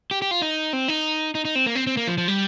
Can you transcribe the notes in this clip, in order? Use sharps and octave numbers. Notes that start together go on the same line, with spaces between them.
G4
G4
F4
D#4
C4
D#4
D#4
D#4
C4
A#3
C4
C4
A#3
F3
F3
G3